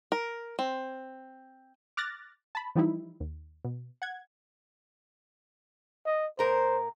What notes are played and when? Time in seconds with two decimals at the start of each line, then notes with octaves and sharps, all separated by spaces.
0.12 A#4
0.59 C4
1.97 D6 F6 F#6 A6 A#6
2.55 A5 B5
2.76 E3 F3 G3 D#4 E4
3.20 D#2
3.65 B2
4.02 F#5 G#6
6.06 D#5
6.39 A2 A#4 C5 A#5